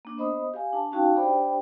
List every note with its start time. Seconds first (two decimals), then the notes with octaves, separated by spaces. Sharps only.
0.05 A#3 D4
0.17 B3 C5 D#5 B5 D#6
0.54 G4 F5 G#5
0.73 D4 A5
0.92 C#4 D#4 F#4 F5 G5 A5
1.16 D4 G4 C5 D5 G5 B5